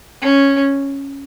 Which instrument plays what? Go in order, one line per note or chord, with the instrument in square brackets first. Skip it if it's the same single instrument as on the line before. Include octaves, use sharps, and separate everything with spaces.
[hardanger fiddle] C#4